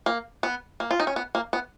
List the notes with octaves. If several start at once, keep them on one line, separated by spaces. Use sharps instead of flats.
A#3
B3
A#3
F4
D#4
C#4
B3
A#3
B3